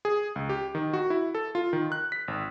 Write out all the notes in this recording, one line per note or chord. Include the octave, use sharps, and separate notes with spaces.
G#4
C#2
G4
D#3
F#4
E4
A4
F4
D#3
F#6
B6
G#1